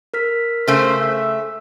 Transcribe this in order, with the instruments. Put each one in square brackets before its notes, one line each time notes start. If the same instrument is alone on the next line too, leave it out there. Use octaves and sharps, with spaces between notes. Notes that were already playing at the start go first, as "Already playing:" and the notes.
[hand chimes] A#4 F6 B6
[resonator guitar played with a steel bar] C#3 A3 [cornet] C5
[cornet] E5